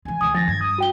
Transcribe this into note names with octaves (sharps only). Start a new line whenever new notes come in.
E3 G#3 G#5
D2 D#3 D#6
F3 A6 A#6
G2 G#6
D#6
F#4 G5 G7